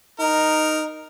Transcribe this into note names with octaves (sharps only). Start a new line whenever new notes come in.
D#4 A#4